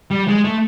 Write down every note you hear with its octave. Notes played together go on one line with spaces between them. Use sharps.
G3
G#3
A3